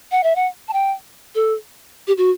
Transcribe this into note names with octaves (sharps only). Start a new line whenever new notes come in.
F#5
E5
F#5
A5
G5
A4
G4
F#4